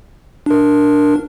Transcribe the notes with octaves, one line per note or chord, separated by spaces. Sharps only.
D4 A#4